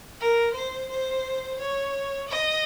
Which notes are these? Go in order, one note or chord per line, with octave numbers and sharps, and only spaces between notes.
A#4
C5
C5
C#5
D#5